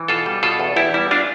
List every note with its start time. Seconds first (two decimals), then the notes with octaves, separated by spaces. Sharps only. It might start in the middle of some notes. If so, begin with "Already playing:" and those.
Already playing: E3
0.08 B2 F4 A4
0.26 G3
0.43 B2 F4 A4
0.60 E2
0.76 E2 E4 G4
0.94 G3 E4
1.11 D4 F4